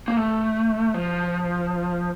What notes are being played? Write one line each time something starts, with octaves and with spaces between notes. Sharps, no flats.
A#3
A3
F3